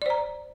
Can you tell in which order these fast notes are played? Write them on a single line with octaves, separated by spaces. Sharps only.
D5 C5 A#5